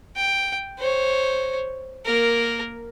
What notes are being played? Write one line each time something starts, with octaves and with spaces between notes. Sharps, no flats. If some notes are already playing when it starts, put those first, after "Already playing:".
G5
C5 C#5
A#3 A#4